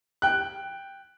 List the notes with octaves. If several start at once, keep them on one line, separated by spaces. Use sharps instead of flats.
G5 F#6